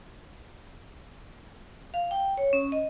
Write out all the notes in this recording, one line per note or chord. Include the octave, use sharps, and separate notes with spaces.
F5
G5
C#5
C#4
D#5